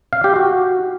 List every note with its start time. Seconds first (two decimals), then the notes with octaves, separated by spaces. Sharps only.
0.13 F5
0.24 G4
0.36 F#4